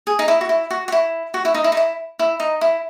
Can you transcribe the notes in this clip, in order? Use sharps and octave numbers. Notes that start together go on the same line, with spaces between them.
G#4
D#4
E4
F#4
E4
F#4
F#4
E4
F#4
E4
D#4
E4
D#4
E4
E4
D#4
E4